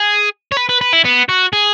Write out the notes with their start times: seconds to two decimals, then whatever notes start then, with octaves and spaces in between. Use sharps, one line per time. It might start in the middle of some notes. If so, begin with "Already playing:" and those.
Already playing: G#4
0.52 C#5
0.57 B4
0.69 B4
0.81 B4
0.93 E4
1.05 B3
1.29 F#4
1.53 G#4